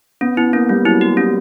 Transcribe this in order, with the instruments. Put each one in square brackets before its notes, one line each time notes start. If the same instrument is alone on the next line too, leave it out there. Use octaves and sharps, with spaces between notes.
[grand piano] B3 [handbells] C#4
[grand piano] B3 [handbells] E4
[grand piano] A#3 [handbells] C#4
[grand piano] G3 [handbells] C#4
[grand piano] F#3 [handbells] E4
[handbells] G4
C#4